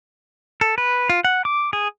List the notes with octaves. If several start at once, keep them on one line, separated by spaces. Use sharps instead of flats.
A4
B4
F4
F#5
D6
G#4